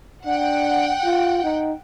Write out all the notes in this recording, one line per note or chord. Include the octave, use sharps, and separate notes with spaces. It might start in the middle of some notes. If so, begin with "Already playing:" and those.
D4 F#5 G5
F4
D#4